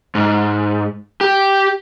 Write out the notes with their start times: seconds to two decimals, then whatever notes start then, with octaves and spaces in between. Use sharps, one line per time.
0.15 G#2
1.21 G4